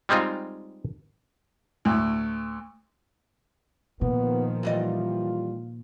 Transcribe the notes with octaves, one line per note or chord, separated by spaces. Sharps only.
G3 G#3 C4 D#4 F4
D2 A2
A#2 D#3 F3 B3
E3 G3 F4 D#5